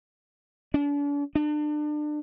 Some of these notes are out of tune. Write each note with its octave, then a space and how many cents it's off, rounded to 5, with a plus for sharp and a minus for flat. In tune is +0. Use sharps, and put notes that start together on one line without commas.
D4 -40
D4 +30